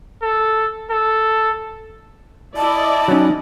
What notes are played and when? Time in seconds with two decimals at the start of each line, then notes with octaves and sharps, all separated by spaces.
0.22 A4
0.90 A4
2.57 E4 D5 D#5 A5
3.08 F#3 C#4 D#4